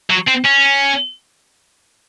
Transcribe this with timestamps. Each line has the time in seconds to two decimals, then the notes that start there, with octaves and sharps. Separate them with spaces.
0.10 F#3
0.27 C4
0.44 C#4